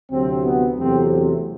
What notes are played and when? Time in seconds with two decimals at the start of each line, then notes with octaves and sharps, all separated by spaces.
0.11 D2 C3 F#3 C4
0.45 B3
0.78 E2 C3 F#3 A3 C4